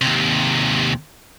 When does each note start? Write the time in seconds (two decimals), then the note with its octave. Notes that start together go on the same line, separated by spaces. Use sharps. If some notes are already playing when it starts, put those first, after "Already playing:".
0.01 D#2 C3